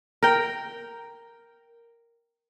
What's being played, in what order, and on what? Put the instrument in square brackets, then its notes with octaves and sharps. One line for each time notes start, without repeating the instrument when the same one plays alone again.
[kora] A#4 G5